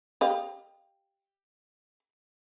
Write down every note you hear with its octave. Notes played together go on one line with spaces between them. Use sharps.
G4 D#5 F5